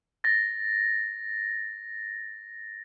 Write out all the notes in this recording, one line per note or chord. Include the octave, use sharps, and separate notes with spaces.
A6 A#6